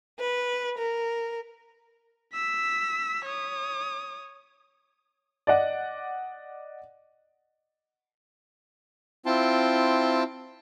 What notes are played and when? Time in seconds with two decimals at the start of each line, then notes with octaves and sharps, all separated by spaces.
0.19 B4
0.76 A#4
2.33 E6 B6
3.25 C#5 D#6
5.47 D5 D#5 F#5
9.26 C4 E4 F4 G5 A5 C6